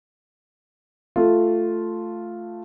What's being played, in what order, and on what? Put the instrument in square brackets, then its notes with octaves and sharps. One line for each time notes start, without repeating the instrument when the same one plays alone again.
[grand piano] A3 F4